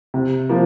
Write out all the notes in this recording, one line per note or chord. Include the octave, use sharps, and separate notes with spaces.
C3
F3 A#3